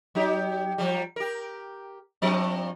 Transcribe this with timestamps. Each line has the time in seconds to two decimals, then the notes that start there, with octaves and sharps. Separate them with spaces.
0.15 F#3 D#4 G4
0.78 F3 G3
1.16 G4 A#4
2.22 G2 F3 C4